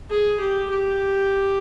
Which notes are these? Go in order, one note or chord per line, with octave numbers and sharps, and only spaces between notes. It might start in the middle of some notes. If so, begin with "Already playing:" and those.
G#4
G4
G4